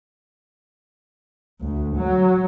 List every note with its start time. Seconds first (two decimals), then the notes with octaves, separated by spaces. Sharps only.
1.61 D2
1.97 F#3